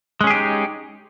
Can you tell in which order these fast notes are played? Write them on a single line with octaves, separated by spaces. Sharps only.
G#3 C#4 G#4 G4 D#4